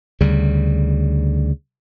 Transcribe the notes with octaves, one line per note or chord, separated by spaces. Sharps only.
D2 C#3 G3